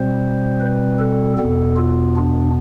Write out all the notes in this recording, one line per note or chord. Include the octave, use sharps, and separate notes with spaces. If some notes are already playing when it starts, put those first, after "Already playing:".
Already playing: B2 G3 C4 C5
B4
A4
E2 B2 B3 A4
F4
D4